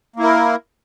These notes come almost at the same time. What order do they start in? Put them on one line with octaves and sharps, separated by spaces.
A#3 E4 A#4